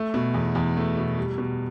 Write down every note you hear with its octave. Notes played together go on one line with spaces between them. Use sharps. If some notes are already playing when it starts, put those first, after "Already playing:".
Already playing: A3
B2
E2
E2
A3
B2
G3
B2